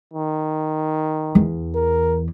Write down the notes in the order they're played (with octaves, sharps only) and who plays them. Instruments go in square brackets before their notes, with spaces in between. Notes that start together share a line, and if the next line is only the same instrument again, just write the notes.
[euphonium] D#3
[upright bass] E2
[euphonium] A#4